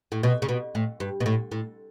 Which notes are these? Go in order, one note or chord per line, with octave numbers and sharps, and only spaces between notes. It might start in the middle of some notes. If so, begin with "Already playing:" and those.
A2
B2
C#3
B2
A2
G2
B2
A2
A2